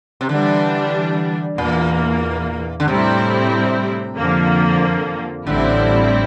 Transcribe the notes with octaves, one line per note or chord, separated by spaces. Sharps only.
C3
D3 E3 G3 D4
E2 A#2 E3 A#3
D3
A2 C3 G3 C4 E4
F2 D3 F3 A#3
A1 A2 D3 G3 C4 E4